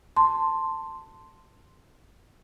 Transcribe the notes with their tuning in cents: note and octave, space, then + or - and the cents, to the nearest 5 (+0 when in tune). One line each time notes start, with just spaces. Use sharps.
A5 +15 C6 +0